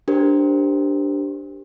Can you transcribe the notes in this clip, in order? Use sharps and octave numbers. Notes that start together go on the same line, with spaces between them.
D4 G4 A#4 C5